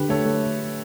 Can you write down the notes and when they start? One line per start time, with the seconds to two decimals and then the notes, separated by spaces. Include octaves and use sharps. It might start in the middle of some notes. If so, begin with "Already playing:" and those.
Already playing: D3 G4 B4
0.09 A3 A4 C#5
0.26 A3